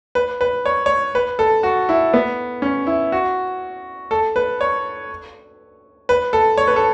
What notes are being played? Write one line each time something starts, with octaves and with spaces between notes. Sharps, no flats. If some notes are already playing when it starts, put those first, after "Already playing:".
B4
B4
C#5
C#5
B4
A4
F#4
E4
B3
C#4
E4
F#4
A4
B4
C#5
B4
A4
C#5
B4
A4